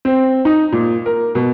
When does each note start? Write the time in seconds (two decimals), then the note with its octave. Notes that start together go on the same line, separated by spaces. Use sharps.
0.05 C4
0.45 D#4
0.72 A#2
1.06 A#4
1.35 B2